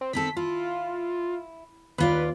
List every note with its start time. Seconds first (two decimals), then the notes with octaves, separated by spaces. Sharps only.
0.01 C4
0.13 D#3 C4 A4 B6
0.37 E4 F4
1.98 D#2 F4 B4 D5